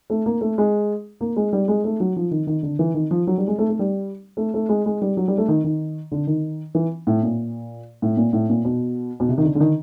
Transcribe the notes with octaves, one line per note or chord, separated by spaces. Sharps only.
A3
A#3
A3
G#3
A#3
G#3
G3
G#3
A3
F#3
F3
D#3
D#3
D3
E3
D#3
F3
F#3
G3
G#3
A3
A3
G3
A3
A3
G#3
G#3
G3
F#3
G3
A3
D#3
D#3
D3
D#3
E3
A2
A#2
A2
A#2
A2
A#2
B2
B2
C3
D#3
D3
D3
D#3